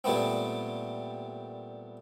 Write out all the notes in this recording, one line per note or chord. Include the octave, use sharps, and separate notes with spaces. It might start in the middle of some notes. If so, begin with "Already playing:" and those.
A#2 G3 A3 B3 C4